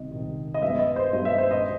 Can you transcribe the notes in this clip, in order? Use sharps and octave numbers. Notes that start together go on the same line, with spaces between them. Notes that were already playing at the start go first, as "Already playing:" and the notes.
Already playing: C2 C3 D#3 D#5
C2 C3 D#3
D#5
G2 F#3 B3 E5
D#5
C5
G2 F#3 B3 D#5
E5
C5
D#5